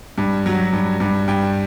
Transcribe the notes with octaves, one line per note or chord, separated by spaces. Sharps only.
G2
F#3
G2
G2
G2 G5